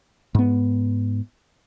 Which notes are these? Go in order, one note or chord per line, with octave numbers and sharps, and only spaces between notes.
G#2 B3